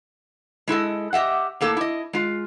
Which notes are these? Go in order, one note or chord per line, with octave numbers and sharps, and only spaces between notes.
G#3 E4 A4 D#5
G4 D#5 E5 F#5
A2 A#3 A4
E4 D#5
G#3 F4